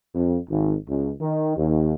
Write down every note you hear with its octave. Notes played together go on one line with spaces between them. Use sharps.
F2
G#1
C#2
D#3
D#2